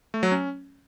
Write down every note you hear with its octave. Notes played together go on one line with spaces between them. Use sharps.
A3
F#3
C#4